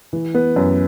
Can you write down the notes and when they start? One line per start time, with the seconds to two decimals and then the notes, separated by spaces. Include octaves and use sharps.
0.13 E3
0.34 B3
0.56 F#2